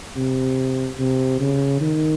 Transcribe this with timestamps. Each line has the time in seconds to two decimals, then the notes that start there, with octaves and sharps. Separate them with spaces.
0.17 C3
0.99 C3
1.40 C#3
1.81 D#3